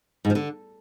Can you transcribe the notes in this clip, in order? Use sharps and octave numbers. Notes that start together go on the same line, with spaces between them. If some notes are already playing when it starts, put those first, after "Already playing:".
G#2
F3
D3